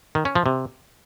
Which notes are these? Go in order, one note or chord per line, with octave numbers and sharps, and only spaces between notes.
D#3
C#4
F3
C3